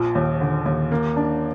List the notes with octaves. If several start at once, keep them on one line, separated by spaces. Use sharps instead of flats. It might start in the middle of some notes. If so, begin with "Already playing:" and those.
Already playing: A#1 F3
D#2
D3
D#2
A#3
D4